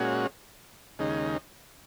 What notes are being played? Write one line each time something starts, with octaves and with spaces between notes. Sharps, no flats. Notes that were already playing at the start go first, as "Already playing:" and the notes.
Already playing: A#2 G#3 C#4 F#4
D#2 C#3 G#3 D#4